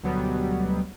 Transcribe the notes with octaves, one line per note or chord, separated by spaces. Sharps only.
D2 B2 F#3 G3 B3